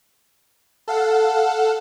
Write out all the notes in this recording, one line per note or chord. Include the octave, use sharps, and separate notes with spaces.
A4 F5 F#5